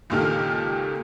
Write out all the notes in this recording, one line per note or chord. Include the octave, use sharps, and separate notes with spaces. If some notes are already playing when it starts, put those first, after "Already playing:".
C#2 A#2 D#3 G4 A4 F6